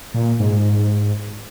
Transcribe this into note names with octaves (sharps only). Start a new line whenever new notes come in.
A#2
G#2